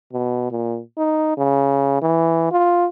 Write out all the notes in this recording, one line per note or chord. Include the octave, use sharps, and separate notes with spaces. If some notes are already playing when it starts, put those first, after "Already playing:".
B2
A#2
D#4
C#3
E3
F4